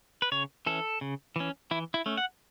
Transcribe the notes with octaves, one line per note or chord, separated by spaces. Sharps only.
B4
C#3 C#5
E3 C#4 A4
C#3
E3 C#4
E3 E4
E4
A3 C#4
F#5